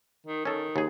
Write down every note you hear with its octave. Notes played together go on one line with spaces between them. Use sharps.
D#3
D#3 C#4 A4
D#2 G#4